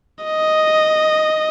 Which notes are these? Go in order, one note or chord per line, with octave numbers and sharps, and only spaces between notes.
D#5